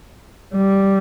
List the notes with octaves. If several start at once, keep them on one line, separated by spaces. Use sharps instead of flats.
G3